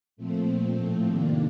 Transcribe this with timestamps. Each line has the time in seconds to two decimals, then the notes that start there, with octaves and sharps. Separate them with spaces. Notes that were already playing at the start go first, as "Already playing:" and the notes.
0.17 A#2 F3 A3 C4
0.46 A#2 F3 A3 C4
0.76 A2 F3
1.05 C3 D#3 A#3 D4